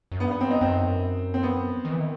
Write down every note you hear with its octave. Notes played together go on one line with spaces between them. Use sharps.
F#2
G2 B3
B3
C4
D#4
F#2 C4
C4
B3
D#3
E3
D#3